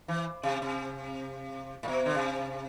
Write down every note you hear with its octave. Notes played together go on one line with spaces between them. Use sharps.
E3
C3
C3
A2
B2
D3
C3